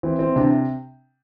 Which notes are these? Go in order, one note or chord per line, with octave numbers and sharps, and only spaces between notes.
E3 C4
E3 C4
C3 D4